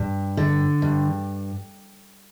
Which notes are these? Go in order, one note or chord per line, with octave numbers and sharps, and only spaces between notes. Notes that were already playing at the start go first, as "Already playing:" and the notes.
Already playing: G2
D3
G2